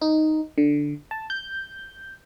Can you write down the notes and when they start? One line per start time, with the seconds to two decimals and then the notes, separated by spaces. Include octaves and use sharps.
0.01 D#4
0.58 D3
1.11 A5
1.30 G6